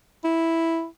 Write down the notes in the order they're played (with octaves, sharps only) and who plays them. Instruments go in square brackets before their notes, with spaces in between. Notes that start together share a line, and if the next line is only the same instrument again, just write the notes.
[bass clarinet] E4